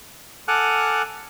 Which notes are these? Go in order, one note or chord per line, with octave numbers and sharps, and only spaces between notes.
A4 F#5 G#5 D6 F6 F#6